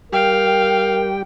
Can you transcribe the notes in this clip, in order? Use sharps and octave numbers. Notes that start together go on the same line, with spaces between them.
G3 G4 A#4 F5 G5